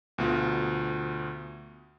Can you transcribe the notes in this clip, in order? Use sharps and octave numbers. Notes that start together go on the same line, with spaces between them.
D2 B2 F4